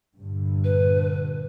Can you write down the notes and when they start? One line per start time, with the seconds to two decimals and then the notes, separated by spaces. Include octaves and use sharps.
0.18 G2 A#2 D3
0.64 B4